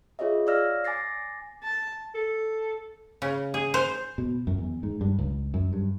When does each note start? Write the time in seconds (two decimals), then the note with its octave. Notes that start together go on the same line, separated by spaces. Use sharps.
0.19 F4 G#4 C#5 D#5 E5
0.46 C#5 D5 F5 E6 F6 A#6
0.85 G#5 D6 A6 A#6 C7
1.63 A5
2.15 A4
3.22 C#3
3.54 G#4
3.74 C5
4.18 B2
4.47 F#2
4.58 E2
4.83 G#2
5.01 G2
5.19 C#2
5.54 F#2
5.73 G2